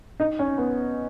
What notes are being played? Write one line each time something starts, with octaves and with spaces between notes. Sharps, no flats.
D#4
C#4
B3